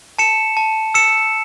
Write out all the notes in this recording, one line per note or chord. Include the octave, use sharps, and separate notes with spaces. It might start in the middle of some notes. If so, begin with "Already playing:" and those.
A5 C#7 E7
A5
E6 C#7 E7